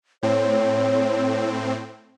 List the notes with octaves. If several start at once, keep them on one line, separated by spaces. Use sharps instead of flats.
A2 C4 C#5